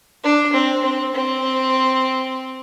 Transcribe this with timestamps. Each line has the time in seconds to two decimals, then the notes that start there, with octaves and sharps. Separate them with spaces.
0.24 D4
0.53 C4
0.83 C4
1.14 C4